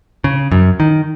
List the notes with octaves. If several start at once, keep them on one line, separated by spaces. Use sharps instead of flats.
C#3
F#2
D#3